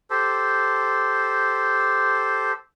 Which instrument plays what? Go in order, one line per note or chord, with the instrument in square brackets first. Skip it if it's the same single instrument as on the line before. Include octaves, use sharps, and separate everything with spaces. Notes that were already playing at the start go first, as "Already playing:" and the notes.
[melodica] G4 A4 C5